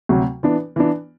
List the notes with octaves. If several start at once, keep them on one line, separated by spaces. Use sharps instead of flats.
D2 C3 F#3
E3 B3 D4
E3 B3 D4